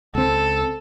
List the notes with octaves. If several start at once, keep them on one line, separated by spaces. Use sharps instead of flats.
C#2 C4 A4